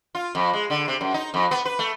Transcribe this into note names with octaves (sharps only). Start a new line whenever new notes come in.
F4
F2
G#3
D3
C3
F#2
D#4
F2
B3
B4
A3